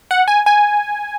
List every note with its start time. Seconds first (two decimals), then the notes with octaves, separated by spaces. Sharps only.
0.11 F#5
0.28 G#5
0.46 G#5